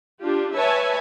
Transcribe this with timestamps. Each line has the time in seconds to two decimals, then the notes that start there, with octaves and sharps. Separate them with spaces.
0.21 D4 F4 G4
0.54 B4 C#5 E5 G#5 A5